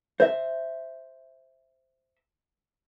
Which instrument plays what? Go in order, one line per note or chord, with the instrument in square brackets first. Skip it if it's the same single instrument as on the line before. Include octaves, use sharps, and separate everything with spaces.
[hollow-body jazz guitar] C5 E5